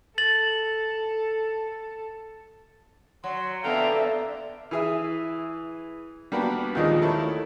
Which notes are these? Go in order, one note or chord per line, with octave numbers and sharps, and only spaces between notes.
A4 A6 F#7
F#3 C6
D3 B3 A4 E5 F5 G5 A#5
E3 G#4 E5
G3 A#3 B3 D4 F#4
D#2 A#2 D#3 F3 G#3 D#5
A3 E4 A#4 C#5